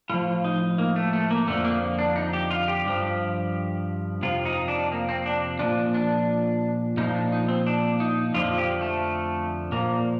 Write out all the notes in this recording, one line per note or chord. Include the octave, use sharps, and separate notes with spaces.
A2 F3 F4
D#4
A#3
A3
A3
A#3
F2 D3 F3 A3
A#3
D4
D#4
G4
F4
G4
G2 F3
F2 C3 F3 F4
D#4
D4
A#3
C4
D4
A#2 F3 D4
D4
A#2 F3 D#4
D4
D#4
C4
D4
D#4
F2 D3 F3 F4
G4
A3
A#2 F3 A#3